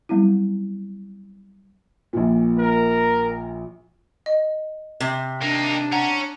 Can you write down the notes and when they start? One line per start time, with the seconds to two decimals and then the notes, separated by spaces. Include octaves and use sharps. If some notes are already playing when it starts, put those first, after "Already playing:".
0.09 F#3 G3 B3 C4 E4
2.13 A#1 A#2
2.59 A#4
4.26 D#5
5.00 C3
5.42 A#3 D4 D#4
5.92 C#4 F#5 A#5